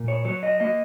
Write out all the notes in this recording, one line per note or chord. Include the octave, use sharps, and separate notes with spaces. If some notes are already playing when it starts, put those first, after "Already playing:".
Already playing: A#2
C#5
F#3 C#5
D#5
A#3 D#5